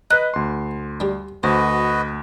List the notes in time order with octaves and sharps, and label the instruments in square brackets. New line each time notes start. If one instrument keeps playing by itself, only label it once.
[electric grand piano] B4 D#5 [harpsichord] A#5 [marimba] F#6
[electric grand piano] D2 C6
[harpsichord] G3 D4
[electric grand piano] D2 [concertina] F#4 B4 D#5 [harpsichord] C5